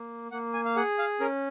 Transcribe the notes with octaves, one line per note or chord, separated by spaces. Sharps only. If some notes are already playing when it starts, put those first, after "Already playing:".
Already playing: A#3
A#3 F#5
G#5
F5
G#4 F#5
F5
C#4 A#4